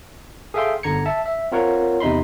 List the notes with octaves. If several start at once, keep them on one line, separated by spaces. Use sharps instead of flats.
G#4 A4 E5 F5 G5 C6
G1 D3 A#5 G#6 C#7
E5 A5
E5
C4 F4 A#4 C#5 F#5
E2 C3 D#4 B5 C6